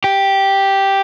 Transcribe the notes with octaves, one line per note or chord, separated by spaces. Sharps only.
G4